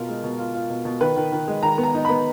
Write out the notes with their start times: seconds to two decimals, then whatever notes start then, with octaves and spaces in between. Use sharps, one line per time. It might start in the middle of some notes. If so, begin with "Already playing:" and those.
Already playing: B2 F4 A#4
0.09 G#3
0.24 B2
0.39 F4
0.54 F4
0.70 B2
0.85 B2
1.01 D#3 B4
1.16 D#3
1.32 D#3
1.48 G#3
1.63 D#3 A#5
1.78 B3
1.83 A#5
1.94 D#4
2.05 B5
2.09 B3